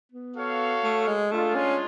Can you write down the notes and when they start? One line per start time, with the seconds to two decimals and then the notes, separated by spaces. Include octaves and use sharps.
0.12 B3
0.36 F#4 A4 C#5 F5
0.84 A3
1.07 G#3
1.31 G#3 A3 D4 F4
1.55 C#4